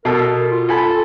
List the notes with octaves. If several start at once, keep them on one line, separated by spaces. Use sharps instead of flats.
B2 A4 A#4
F4
A4 G#5 B5